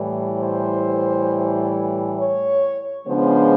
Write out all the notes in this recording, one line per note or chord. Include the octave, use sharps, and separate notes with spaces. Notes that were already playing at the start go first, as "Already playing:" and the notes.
Already playing: A2 E3 G3
C5
C#5
C#3 F3 G#3 B3 D4 C5